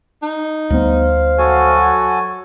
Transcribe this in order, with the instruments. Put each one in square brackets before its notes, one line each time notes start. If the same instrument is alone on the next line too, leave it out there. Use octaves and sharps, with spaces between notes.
[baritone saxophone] D#4
[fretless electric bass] D2 G3 B3 [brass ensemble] C5 F5
[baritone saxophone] F#3 [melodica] F#4 A4 G#5